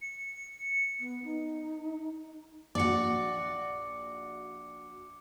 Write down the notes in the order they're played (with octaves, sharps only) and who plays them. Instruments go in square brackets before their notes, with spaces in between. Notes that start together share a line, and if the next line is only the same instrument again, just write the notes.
[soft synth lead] C#7
[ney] B3
D#4
[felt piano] A#1 [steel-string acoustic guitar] F#4 D5 [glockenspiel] D6 C#7